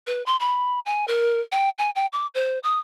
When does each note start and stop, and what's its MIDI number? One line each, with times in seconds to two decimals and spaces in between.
0.07 0.24 71
0.26 0.36 84
0.40 0.79 83
0.86 1.05 80
1.08 1.41 70
1.52 1.69 79
1.78 1.90 80
1.95 2.06 79
2.12 2.27 86
2.34 2.59 72
2.63 2.79 87